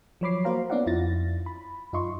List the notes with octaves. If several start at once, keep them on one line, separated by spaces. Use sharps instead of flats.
F3 F#3 C#5 B5 D6 C7
A#3 F#4 C5 F5 A#5
B3 C#4 D#4 D5 F5 F#5
F2 E4 F4 A6 A#6
B5
F#2 D#4 F4 D#5 C6 C#6